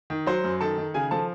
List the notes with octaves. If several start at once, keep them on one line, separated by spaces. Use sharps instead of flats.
D#3
F#3 C5 C6
F#2
D#3 A4 A5
D#3
C#3 G#4 G#5
F3 A4 A5